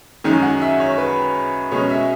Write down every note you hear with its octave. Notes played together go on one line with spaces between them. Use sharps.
F#2 D#3 G#3 C#4 G#5
F#5
E5
C#5
B4
B2 G#3 C#4 C#5
E5